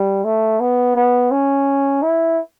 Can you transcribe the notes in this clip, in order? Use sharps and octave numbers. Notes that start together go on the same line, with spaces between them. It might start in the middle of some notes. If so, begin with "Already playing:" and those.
Already playing: G3
A3
B3
B3
C#4
E4